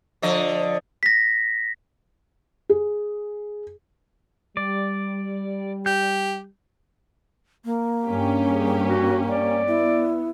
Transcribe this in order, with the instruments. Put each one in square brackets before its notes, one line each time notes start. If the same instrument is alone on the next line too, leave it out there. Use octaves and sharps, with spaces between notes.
[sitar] D3 F3 D#5
[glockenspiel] A#6 B6
[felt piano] G#4
[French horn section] G3 [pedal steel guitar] D5
[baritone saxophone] G4 [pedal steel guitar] G6
[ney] A#3
[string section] G2 C#4 G4
[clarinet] G#4
F#4
D5
[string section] B3 [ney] E4